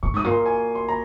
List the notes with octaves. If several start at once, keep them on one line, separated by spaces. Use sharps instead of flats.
A#2 C#6
G#2 D#6
A#2
C6
G#5
C6
A#5